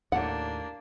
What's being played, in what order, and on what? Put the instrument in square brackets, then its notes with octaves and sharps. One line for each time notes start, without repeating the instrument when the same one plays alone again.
[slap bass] D#2 A2 [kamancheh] A#3 D4 [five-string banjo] F#5